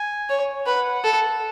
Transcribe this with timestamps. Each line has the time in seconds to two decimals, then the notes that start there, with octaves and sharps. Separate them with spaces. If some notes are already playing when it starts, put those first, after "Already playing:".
Already playing: G#5
0.29 C#5
0.66 B4 F#5
1.04 A4